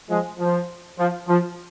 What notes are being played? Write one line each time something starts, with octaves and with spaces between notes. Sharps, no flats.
F3 G#3
F3
F3
F3